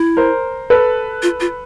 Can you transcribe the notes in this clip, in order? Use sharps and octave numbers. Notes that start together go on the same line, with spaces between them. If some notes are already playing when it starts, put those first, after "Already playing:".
Already playing: E4
A#4 C5
A4 B4
F4
F4